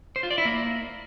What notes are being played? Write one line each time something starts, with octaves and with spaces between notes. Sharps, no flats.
C5
F4
D5
E4
A#3